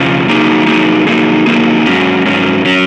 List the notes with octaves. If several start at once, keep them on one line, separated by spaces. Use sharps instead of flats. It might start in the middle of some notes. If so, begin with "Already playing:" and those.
Already playing: F2 C#3 F3
F#3 A#3 D#4 G#4
F#3 A#3 D#4 G#4
F#3 A#3 D#4 G#4
F#3 A#3 D#4 G#4
G#2 F#3 C#4
G#2 F#3 C#4
F#3 C#4